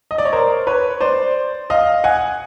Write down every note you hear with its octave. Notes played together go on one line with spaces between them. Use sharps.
D#5
D5
C#5
A#4 C5
B4 C#5
C5 D5
D#5 F5
F#5 G#5